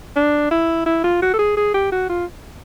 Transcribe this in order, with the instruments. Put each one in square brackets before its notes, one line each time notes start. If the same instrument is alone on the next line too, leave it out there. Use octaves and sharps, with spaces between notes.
[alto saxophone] D4
E4
E4
F4
F#4
A4
G#4
G#4
G4
F#4
F4